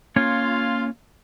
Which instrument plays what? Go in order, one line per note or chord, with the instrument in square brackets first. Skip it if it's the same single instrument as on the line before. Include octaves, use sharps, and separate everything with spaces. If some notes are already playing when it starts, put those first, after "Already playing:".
[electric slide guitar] A#3 C#4 C#5 [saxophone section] F4